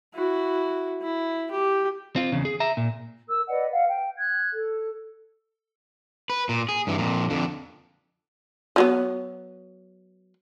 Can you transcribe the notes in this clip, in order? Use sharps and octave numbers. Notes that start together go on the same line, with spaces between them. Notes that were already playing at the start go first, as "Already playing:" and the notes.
E4 F#4
E4
G4
C4 F4
E2 C#3
G#4
E5 A#5
A#2
A#4 E6
B4 D5 D#5 F#5
F5 F#5
G5
F#6 G#6
A4
B4
A#2
G#4
G2 E3
F2 A#2
F2 D3
F3 F#3 B3